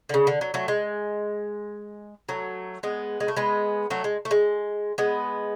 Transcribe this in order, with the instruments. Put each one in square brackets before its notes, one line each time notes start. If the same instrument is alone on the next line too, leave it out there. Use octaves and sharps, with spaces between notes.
[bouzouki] D3
C#3
D3
F#3
F#3 A3
G#3
F#3 A3
G#3 B3
G#3
A3
G#3 B3
F#3 A3
G#3
A3
G#3
G#3 B3